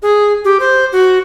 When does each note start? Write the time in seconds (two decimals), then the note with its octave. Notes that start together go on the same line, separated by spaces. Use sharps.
0.03 G#4
0.45 G4
0.60 C5
0.92 F#4